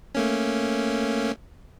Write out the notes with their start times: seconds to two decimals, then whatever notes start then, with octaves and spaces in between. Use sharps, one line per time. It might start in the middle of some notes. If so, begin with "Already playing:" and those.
0.15 A3 A#3 C#4